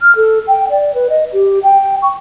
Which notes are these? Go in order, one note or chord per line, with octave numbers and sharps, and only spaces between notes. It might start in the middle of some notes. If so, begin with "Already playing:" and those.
F6
A4
G5
D5
B4
D#5
G4
G5
C#6